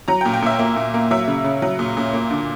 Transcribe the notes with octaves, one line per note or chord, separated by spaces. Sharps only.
F#3 A#5
G5
A#2
G5
A#2 E5
A#3
A#2
A#3
F#3 E5
C#3
C#3
F#3
A#2
A#2
A#3
D3